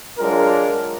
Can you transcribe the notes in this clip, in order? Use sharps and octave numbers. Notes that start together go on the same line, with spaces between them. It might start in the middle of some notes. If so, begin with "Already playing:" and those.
F#3 G#3 D4 F4 A#4